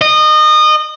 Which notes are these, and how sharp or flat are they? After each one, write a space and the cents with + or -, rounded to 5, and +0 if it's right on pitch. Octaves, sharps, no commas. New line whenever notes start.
D#5 -25